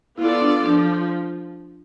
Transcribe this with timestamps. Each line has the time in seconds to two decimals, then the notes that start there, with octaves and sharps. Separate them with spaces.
0.18 B3 E4 F4 A4 D5
0.41 D4
0.66 F3 D4